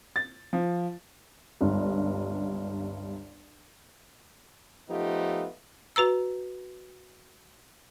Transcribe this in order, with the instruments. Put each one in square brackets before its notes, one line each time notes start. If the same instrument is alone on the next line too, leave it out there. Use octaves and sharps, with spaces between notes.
[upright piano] A6
F3
[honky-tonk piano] G1 C#2 G2
[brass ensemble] F3 A3 B3 D#4 F4 G4
[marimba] F#4 B4 A#5 E6